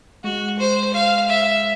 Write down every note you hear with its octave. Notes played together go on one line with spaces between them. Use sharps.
G#3 F#4
C5
F5
E5